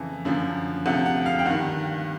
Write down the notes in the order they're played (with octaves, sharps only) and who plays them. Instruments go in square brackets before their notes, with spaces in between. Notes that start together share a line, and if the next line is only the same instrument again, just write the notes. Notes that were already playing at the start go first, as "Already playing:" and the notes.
Already playing: [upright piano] F2 C#3 E3
F#2 D3 F3
D2 C3 F3 F#5
F#5
F5
G5
G2 D#3 F#5